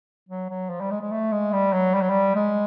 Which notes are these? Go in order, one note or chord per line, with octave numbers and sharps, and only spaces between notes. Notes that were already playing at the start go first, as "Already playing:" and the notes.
F#3
F#3
F3
G3
G#3
G#3
A3
G#3
G3
F#3
G3
F#3
G3
G#3